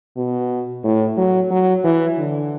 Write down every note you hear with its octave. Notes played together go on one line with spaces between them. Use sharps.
B2
A2
F#3
F#3
E3
D3